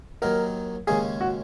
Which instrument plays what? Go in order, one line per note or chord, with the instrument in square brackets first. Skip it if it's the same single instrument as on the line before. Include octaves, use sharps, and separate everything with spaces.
[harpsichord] D#2 D#3 F#3 D#4 [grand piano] A#4
[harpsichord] D#2 C#3 G#3 C#4 [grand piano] G#4
[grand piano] F#4